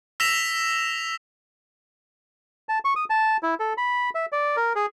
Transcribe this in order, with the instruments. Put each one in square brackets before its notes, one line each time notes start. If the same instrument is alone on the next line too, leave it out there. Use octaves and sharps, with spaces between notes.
[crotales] E6 A#6 B6 E7 F7
[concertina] A5
C#6
D#6
A5
E4
A4
B5
E5
D5
A#4
G#4